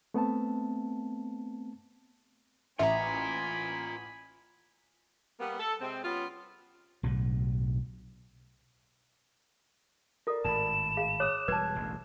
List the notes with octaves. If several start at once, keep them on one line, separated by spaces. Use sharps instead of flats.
A3 B3 C4 A5
A1 F4 E5 G#5 A#5 B5
G3 A#3 B3
A4
C3 G#3 C4
G3 B3 C#4 F4
B1 A2 D3
F4 A4 A#4 D5
G#1 A2 A5 B5 E7
G#4 F5
C#5 D6 D#6 F#6
E1 G3 B4 A5 F#6 G#6
E1 A1 D2